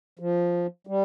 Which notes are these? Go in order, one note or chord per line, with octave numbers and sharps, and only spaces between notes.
F3
G3